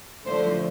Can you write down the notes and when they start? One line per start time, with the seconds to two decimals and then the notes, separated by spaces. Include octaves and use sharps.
0.26 D3 F3 A3 C5